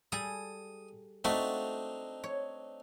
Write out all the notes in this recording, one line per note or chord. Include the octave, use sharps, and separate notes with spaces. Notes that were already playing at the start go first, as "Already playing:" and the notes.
G3 G#4 A4 D#6
A3 C4 D4 D#4 F#4
C#5